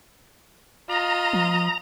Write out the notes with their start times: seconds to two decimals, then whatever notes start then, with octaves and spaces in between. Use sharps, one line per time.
0.89 F4 D#5 A#5
1.33 F3